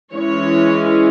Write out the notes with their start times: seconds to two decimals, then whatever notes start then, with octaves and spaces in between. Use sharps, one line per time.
0.14 E3 G#3 C#4 C#5